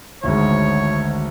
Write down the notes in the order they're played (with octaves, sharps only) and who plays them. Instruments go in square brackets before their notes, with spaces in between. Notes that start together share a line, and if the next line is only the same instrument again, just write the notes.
[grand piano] G#1 D2 G#2 [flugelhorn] C#5